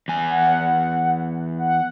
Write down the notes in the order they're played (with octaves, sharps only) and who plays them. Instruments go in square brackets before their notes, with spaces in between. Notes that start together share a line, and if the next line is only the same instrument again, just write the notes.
[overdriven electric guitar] E2 G#5
[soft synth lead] F#5
F#5